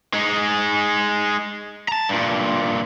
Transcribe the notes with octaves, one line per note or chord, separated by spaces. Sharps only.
G#3 D#4
A5 A#5
G2 A#2